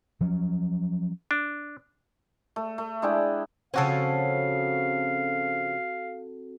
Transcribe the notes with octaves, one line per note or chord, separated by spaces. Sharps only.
F3 F#3 C#4
D4
A3
A3
G#3 D4 E4 G5
C#3 F3 C4 C#4 F#4 A4 F5